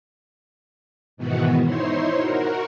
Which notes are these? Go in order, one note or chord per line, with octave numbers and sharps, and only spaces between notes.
G#2 B2 D#3 E3 B3 F#4
D#4 E4 C5 C#5 C6
F#4 A#4